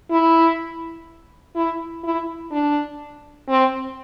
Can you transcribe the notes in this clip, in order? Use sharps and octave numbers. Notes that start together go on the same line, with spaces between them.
E4
E4
E4
D4
C4